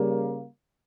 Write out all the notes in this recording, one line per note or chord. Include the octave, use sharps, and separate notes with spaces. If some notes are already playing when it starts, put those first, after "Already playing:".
Already playing: C#3 G3 A#3